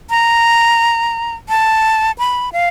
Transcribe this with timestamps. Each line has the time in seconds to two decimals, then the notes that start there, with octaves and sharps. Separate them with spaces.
0.10 A#5
1.49 A5
2.19 B5
2.53 F5